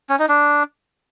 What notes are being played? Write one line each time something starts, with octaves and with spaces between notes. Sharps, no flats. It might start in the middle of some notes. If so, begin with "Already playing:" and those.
C#4
D#4
D4